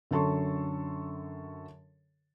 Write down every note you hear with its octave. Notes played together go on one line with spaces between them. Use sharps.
F#2 D3 A4 A5 C6 C#6